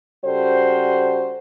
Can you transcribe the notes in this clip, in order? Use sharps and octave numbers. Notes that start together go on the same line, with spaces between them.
C#3 G3 F#4 A4 C5